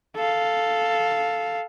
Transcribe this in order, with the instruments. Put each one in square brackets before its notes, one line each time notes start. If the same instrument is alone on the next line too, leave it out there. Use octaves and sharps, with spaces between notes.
[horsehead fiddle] A4 F5